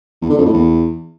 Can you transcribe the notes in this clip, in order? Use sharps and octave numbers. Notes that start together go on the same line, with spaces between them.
E2
D3
F2
A2
E2